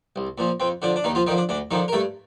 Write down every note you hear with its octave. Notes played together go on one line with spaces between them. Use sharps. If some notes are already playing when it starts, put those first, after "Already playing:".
C2
A#2 F3
F2 C4
D3 F3 D4
D4
D#2 D#3 D#4
F3 F4
D3 D#3 F3 D#4
D4
D2 D4
D3 D#3 F3 D#4
A#4
G2 A3 A4